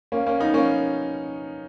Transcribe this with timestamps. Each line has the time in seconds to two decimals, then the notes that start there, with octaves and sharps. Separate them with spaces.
0.12 A#3 C#4
0.26 A#3 C#4
0.40 B3 D#4
0.54 A#3 C#4